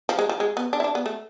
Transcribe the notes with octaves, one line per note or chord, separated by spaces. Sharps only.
F3
G#3
F3
G#3
B3
D4
E4
D4
B3
A3